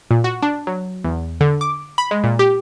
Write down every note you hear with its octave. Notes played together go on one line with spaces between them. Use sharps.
A#2
F#4
D4
F#3
E2
D3
D6
B5
G#3
A#2
G4